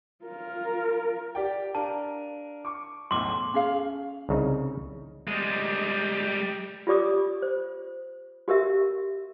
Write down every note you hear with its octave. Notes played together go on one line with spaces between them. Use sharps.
F4 A#4
G4 D5 G5
D4 A#4 F5 A5
C#6 D6
B1 E2 A2 C6 D6
C#4 G#4 F5
C2 C#3 D#4
G3 G#3
F4 G4 D5 D6 D#6
C5
F#4 G4 A#4 E5